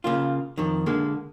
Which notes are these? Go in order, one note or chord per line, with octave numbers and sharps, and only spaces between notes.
C#3 A#3 F4
F2 D#3
D3 G#3 A#3